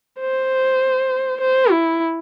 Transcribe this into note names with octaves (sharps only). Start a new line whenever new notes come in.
C5
C5
E4